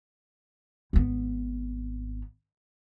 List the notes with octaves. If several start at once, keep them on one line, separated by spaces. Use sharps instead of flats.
G#1 B3